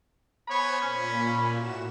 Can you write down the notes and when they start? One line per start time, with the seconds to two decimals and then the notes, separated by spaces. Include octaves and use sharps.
0.48 B3 C5 C#5 G#5 B5
0.82 A#2 C#4
1.52 A2 F#4 E7